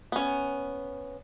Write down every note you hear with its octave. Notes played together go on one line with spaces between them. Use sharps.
B3 C#4